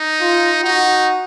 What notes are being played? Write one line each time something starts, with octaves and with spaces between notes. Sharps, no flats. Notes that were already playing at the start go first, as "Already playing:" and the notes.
Already playing: D#4
F4
D#4 F#4